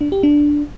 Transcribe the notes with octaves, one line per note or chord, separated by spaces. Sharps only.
D4
G4
D4